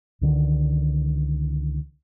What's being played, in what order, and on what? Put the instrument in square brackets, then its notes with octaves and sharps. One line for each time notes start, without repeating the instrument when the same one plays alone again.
[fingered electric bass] C#2 D3 D#3